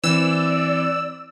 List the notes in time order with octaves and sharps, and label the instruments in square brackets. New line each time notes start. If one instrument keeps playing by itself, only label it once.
[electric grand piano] E3 [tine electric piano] C4 [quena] D5 [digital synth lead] E6